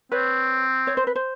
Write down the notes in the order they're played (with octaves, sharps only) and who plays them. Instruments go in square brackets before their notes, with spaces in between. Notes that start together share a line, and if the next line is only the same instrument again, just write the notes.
[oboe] C4 [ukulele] B4 C#5
[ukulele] C#5
C5
B4
C5